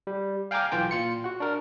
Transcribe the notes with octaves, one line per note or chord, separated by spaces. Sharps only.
G3
F5 G5 G#5 A#5 D6 F6
B1 E3 F4 G5
A#2 F4 C#7
F#4 F#5
D4 A#4